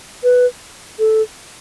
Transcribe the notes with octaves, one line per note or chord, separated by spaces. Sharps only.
B4
A4